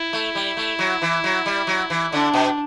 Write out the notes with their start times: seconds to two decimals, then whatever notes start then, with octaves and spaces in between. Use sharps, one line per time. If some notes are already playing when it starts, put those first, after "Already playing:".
Already playing: E4
0.13 A3
0.35 G3
0.57 A3
0.79 F#3
1.02 E3
1.24 F#3
1.46 G3
1.67 F#3
1.90 E3
2.12 D3 D4
2.34 B2